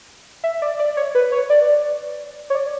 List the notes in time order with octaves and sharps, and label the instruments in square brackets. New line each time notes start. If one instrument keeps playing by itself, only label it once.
[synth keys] E5
D5
D5
C#5
B4
C#5
D5
C#5
D5